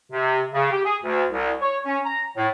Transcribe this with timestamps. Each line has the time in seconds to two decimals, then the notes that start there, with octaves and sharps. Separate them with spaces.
0.12 C3
0.54 C#3
0.71 G4
0.85 G#4
1.04 D2
1.32 C2
1.62 C#5
1.86 C#4
2.05 A#5
2.37 A2